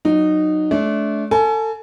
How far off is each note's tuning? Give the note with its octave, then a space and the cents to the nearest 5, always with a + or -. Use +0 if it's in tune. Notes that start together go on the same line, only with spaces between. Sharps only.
F#3 +0 D#4 -15
A3 -35 D4 -35
A4 +30 G#5 +35